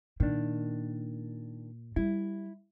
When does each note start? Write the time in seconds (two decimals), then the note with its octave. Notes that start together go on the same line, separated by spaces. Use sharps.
0.20 A#2 D#3 D4
1.96 G3 E4